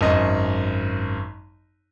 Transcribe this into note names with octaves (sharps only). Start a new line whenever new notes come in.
G#1 F#2 D#5